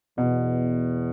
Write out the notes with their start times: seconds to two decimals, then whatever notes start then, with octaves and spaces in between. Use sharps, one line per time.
0.17 E2 B2